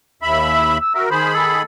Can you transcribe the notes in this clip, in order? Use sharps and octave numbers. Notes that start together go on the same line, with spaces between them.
D#2 E5 B5
E6
E6
F#4 A#4 E5
D#3 G#4 C5 B5
A4